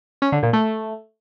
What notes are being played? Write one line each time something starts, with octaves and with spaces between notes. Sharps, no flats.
C#4
D3
A#2
A3